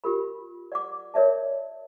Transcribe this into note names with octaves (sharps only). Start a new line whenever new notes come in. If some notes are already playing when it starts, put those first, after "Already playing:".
F4 G4 A#4 B5
D5 F#5 D6
A#4 C#5 D5 E5 A5